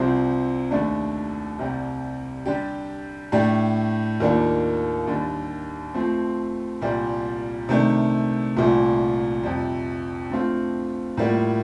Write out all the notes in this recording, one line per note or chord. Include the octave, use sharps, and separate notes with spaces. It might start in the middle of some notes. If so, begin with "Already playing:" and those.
Already playing: C2 C3 F3 C4
D#2 D3 A3 D4
C2 C3 G3
D3 G3 D4 G4
A2 A3 D4 G4
D#2 D#3 A#3 D4 F4
D#2 D3 G3
F3 A3 C4
C2 A#2 G3
C3 D#3 A3 D4
C2 A#2 F3 A3
F2 C3 G3
D3 A3 C4 F4
A2 G3 A#3 F4